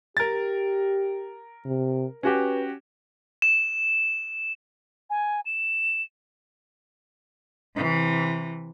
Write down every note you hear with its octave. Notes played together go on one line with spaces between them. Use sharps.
G4 A#4 A6
C3
C#4 F#4 G4 B4
E7
G#5
E7
C3 E3